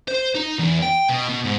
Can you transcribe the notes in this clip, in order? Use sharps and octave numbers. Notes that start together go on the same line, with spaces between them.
C5
D#4
E2
G5
B2
B2
G#2